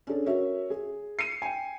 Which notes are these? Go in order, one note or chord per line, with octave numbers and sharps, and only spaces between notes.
C#4 D4 G#4 A4
F#4 A#4 C#5 E5
G#4
C7 C#7 D#7
G5 G#5